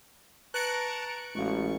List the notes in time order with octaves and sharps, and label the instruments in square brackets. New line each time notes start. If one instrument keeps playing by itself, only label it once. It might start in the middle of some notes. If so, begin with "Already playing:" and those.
[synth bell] B4 [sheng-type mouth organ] A5 A#5 C#6 [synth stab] F#6 C#7 D7
[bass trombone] A1 [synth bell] G#3 F#4 F5 [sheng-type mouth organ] C#6